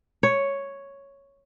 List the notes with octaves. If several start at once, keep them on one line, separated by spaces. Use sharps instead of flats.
C#5